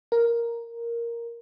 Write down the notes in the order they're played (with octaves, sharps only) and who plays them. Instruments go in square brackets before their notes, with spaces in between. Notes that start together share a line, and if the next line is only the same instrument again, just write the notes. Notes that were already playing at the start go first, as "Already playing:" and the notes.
[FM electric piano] A#4